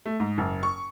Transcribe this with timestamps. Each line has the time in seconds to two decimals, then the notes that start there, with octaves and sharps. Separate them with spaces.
0.06 A3
0.20 G#2
0.38 F#1
0.63 C#6